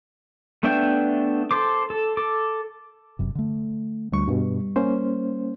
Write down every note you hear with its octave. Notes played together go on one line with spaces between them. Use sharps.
A3 B3 D4 E5 G5
A4 C5 D6
A4
A4 D6
F#1 F#2 C3
D3 A3
D2 G3 C#6
G2 B2
A#3 C#4 C5